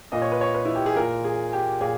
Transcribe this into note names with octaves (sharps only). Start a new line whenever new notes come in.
A#2 D#5
C#5
B4
C#5
B4
E4
G4
G#4
A#2 A#4
G#4
G4
A#2 G#4